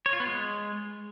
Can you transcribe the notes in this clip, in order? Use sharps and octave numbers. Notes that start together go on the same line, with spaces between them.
C#5
F4
B3
G#3